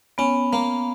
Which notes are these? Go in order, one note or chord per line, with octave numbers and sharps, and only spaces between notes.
B3 C#4
A#3